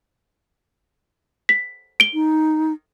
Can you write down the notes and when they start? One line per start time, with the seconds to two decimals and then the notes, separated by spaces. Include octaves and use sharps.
1.49 B6
2.00 D7 G7
2.14 D#4